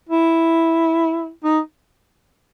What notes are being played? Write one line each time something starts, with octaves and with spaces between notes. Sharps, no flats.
E4
D#4